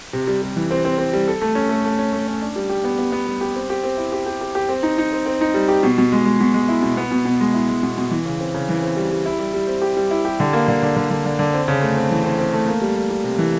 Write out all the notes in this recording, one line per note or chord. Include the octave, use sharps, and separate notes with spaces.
C3
G3
G3
E3
C4
C4
C4
G3
A4
A3
C#4
A3
A3
C#4
A3
C#4
D4
G3
G4
B3
B3
B3
G3
G4
C4
G4
C4
E4
G4
G4
G4
G4
C4
D#4
D#4
C4
C4
D#4
G3
G4
B2
B2
G#3
G#3
B2
G#3
E4
B2
B3
B2
B2
G#3
E4
G#3
B2
B2
E3
C#3
C4
C#3
E3
C4
G3
G3
E4
G3
G3
C4
G4
G3
E4
G4
D3
A#3
D3
D3
D3
D3
D3
D3
C4
C#3
A3
C4
E3
C4
C4
A3
A#3
G3
G3
G3
C3
E3